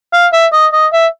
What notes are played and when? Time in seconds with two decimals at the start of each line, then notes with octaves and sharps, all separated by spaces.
0.13 F5
0.33 E5
0.53 D#5
0.73 D#5
0.93 E5